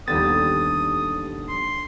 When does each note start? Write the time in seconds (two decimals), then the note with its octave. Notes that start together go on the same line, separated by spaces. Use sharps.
0.08 D#2 D3 F3 G3 B3 D#6 A6
1.48 C6